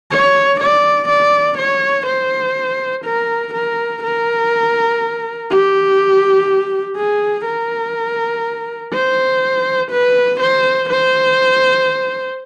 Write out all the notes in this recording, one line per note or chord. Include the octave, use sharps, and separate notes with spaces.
C#5
D5
D5
C#5
C5
A#4
A#4
A#4
G4
G#4
A#4
C5
B4
C5
C5